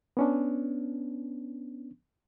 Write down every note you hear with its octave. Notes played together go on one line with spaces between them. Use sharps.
B3 C#4 D4